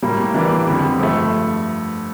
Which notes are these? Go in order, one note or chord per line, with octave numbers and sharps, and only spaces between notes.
A2 G3 A#3
E3 G3 A#3 D4
F2 D3 G3
G2 F3 A3